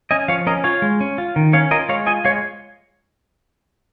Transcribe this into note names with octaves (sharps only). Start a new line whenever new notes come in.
C#4 D#5 G#5
F3 C#5 F5
C#4 A#4 D#5
F4 C#5 F5
G#3
C#4
F4
D#3
C#4 C#5 F5
F4 A#4 D#5
G#3 C#5 F5
F4 D#5 G#5
G#3 C#5 F5